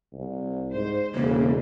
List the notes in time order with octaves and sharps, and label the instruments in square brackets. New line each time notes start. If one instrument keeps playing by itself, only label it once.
[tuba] C2
[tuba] G#2 [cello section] C5
[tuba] E1 [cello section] C#3 [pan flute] A#3